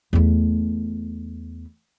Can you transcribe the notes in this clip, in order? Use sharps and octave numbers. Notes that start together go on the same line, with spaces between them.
E2 A3